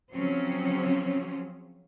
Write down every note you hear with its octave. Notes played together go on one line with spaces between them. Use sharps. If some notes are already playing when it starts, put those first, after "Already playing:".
C#3 F3 F#3 C4 C#4